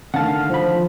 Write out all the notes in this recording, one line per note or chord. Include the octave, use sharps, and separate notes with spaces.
D3 D#3 A3 F5 F#5 A5
C2 F3 B5